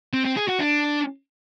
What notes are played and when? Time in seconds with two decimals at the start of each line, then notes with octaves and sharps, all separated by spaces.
0.13 C4
0.25 C4
0.37 G#4
0.49 F#4
0.60 D4